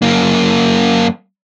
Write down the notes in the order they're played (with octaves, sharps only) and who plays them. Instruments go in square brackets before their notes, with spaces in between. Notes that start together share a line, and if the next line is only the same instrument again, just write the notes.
[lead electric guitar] F#2 A#3